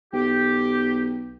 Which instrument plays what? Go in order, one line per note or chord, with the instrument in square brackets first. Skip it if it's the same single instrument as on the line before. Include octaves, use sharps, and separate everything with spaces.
[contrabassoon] B1 [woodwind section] G4